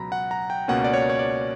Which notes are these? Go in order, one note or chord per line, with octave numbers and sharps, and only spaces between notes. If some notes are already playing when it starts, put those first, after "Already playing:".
Already playing: C#2 B2 F#3 A#5 B5
F#5
A#5
G5
C#2 B2 A#3 C#4 F#5
D5
C#5
C#5
D5